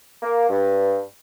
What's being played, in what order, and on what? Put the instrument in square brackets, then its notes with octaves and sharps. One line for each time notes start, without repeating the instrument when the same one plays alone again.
[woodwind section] A#3
G2